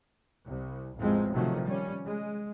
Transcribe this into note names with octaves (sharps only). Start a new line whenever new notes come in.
C2
A1 F2 F3 G#3 C4
C3 D#3 F3 F#3 A3
G3 C#4
G#3